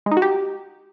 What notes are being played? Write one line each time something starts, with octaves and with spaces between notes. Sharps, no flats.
G#3
D#4
F#4
G4